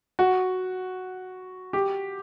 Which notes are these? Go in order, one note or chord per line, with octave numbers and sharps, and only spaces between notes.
F#4
G4